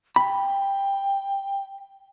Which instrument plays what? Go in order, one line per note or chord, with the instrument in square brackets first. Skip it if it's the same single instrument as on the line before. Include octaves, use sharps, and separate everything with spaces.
[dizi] G5 [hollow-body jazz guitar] B5